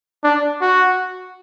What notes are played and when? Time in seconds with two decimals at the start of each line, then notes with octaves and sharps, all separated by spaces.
0.24 D4
0.61 F#4